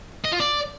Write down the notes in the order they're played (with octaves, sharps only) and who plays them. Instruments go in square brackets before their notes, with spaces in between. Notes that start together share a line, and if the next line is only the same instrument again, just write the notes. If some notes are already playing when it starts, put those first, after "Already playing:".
[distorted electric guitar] D#5
F4
D5